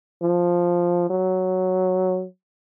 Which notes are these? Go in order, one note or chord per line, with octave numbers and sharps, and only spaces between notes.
F3
F#3